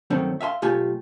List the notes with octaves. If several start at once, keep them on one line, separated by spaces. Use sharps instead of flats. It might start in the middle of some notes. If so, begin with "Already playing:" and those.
G2 D#3 F#3 A3 C4 C#4
E5 F5 G#5 C6
B1 A3 F4 G4 G#5